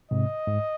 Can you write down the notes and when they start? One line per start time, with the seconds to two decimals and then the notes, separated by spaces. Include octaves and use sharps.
0.11 G#2 C3 D#5
0.47 G#2